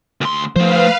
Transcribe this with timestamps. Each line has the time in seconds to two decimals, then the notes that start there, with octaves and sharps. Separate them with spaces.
0.21 D2 C6
0.56 F3 A3 B4 C5 F5